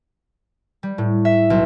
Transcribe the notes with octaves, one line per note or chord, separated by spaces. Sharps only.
G3
A2
E5
B1